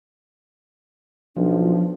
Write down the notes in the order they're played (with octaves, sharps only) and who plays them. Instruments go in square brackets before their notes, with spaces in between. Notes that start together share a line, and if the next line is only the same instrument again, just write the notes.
[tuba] B1 [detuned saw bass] F3 [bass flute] D4